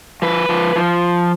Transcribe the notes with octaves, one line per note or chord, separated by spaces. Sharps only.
F3 B4
F3
F3